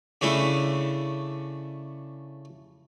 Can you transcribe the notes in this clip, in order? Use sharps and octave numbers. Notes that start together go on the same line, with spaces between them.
C#3 A3 C#4 D4 E4